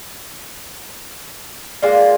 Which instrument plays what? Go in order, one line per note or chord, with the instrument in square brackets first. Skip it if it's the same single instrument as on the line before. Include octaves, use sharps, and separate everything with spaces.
[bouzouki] G#3 A#3 F4 [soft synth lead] D5